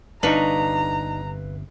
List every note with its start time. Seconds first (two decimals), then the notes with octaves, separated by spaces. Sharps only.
0.23 G1 C3 D4 D#4 B4 F5 A#5 C#6